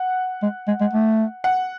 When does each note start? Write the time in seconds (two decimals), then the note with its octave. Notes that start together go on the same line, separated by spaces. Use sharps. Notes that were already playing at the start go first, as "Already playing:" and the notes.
Already playing: F#5
0.43 G#3
0.68 G#3
0.81 G#3
0.93 A3
1.44 F#5